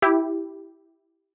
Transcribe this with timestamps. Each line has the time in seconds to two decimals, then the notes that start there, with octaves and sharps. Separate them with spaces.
0.02 E4 G4